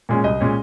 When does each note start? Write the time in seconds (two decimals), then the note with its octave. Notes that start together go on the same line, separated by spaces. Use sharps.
0.09 A#2 G#3 C#4
0.24 C2 D#5
0.40 A#2 G#3 C#4